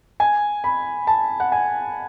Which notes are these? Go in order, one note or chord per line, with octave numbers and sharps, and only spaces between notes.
G#5
B5
A5
F#5
G#5